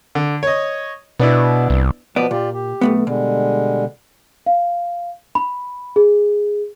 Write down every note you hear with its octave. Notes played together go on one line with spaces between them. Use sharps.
D3
C#5 D#5
B2 B3 D4 E4
C2
B2 F3 B3 D5
A#2 F4 G4 D5
G4
B1 A3 B3
B2 D3 G3 G#3
F5
B5
G#4